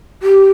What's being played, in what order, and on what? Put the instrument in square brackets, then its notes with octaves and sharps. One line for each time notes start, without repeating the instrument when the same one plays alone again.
[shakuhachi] G4